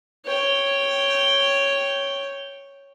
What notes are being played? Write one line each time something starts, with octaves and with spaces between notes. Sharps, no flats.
C#5 G5